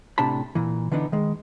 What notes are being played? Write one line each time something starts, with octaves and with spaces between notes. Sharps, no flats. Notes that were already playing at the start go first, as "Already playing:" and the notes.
A2 C3 D4 A5 B5
A#2 E3
D3 E3 B3 D4 D#4
D#3 G#3